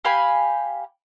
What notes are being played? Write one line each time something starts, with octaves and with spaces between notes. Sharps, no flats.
G4 F5 G#5 B5